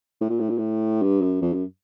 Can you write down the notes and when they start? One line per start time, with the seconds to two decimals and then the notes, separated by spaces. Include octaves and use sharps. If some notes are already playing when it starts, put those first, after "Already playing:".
0.21 A2
0.30 A#2
0.40 A2
0.49 A#2
0.58 A2
1.02 G2
1.22 F#2
1.42 F2
1.53 F#2